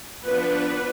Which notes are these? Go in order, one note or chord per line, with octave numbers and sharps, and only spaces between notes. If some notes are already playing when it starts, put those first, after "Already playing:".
F3 B3 D4 B4